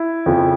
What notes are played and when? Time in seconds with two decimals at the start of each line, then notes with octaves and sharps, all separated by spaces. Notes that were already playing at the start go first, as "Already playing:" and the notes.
Already playing: E4
0.26 F2 C#3 F3